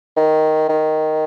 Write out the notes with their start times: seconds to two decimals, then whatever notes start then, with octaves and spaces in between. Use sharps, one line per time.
0.17 D#3
0.69 D#3